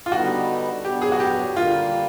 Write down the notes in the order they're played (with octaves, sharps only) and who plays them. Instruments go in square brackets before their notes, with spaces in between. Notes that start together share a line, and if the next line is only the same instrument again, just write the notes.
[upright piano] F4
[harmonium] D3 G3 B3 D#4 [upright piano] F#4
[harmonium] B2 F#3 B3 D4 [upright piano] G4
[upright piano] G#4
F#4
G4
[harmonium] D3 G3 A#3 [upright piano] F4